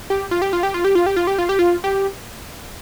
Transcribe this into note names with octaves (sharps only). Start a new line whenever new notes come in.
G4
F4
G4
F4
G4
F4
G4
F4
G4
F4
G4
F4
G4
F4
G4